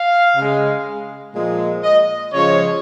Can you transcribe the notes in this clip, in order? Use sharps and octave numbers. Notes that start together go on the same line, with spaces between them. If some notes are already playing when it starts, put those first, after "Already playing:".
Already playing: F5
C#3
G#3
A#2 F3 G#3
D#5
C#3 F3 G#3 C#5